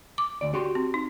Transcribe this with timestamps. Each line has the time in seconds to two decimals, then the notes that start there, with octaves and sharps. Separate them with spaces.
0.18 D6
0.41 D2 D5
0.54 F#4 G4 C6
0.75 C4
0.94 D#4